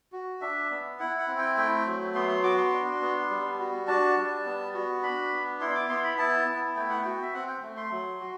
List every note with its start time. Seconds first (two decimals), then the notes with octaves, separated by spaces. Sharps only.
0.12 F#4
0.41 D4 E5
0.70 B3
0.99 E4 F#5
1.18 F#5
1.28 C4
1.38 G5
1.57 A3 G5
1.86 F#3
2.15 B3 C6
2.29 C6
2.43 F#4 D6
2.58 C6
2.73 D4
3.01 B3
3.30 G3
3.59 F#4
3.88 D4 A5
4.17 G3
4.45 B3
4.74 F#4
5.03 D4 B5
5.32 B3
5.61 E4 C6
5.75 D6
5.89 B3 C6
6.04 B5
6.18 E4 A5
6.47 B3
6.76 A3 G5
6.89 F#5
7.02 F#4 G5
7.22 E5
7.34 C4 F#5
7.48 G5
7.62 A3
7.77 C6
7.91 F#3
8.20 F#4